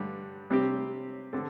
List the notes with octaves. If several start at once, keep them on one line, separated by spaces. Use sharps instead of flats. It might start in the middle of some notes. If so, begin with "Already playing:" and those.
Already playing: G2 D3 G3
C3 G3 C4 G4
D3 C4 A4